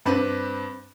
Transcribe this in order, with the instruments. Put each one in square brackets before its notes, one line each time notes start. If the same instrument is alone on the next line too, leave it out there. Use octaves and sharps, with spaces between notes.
[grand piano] G2 C4 D4 B4